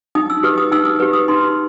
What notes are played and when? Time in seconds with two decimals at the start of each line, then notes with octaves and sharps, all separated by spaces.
0.15 D#4 D#6
0.30 E6
0.43 G4 B4 D#6
0.58 D#6
0.72 D#4 E6
0.85 D#6
1.00 G4 B4
1.13 D#6
1.28 D#4 C6